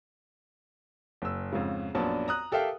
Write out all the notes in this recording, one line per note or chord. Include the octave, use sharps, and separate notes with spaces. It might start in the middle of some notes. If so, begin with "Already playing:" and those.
F#1 E6
F2 G#2 C#3
A#1 F#2 B3 D4 A5
A#5 D#6 F#6
G4 A4 A#4 E5 F5 G5